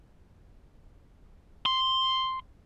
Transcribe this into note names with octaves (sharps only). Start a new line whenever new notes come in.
C6